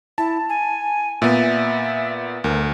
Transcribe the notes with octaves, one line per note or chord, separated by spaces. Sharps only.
E4 A5
G#5
A#2 B3 E5
D2 A#4